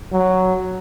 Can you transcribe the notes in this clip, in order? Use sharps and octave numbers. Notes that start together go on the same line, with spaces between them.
F#3